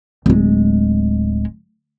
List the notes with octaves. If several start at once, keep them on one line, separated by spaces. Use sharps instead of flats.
D1 G#3